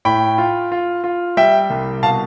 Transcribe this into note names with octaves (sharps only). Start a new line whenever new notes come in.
A2 G5 B5
F4
F4
F4
G3 E5 G5
C2
B2 F5 A5